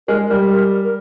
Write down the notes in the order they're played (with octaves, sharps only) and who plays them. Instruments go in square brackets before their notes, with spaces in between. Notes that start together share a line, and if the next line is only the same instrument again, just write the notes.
[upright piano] G#3 [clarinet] A#4
[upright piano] G3 [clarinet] A#4
[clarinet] A#4
A#4